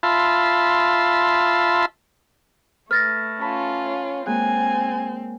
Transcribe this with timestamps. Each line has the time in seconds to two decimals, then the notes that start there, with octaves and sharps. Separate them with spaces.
0.03 F4 E5 A5 B5 C6
2.91 A3 B4 F6 A6 A#6
3.41 C#4 F4 C#5 A5 B5
4.27 G#3 A#3 C4 G#5 F#6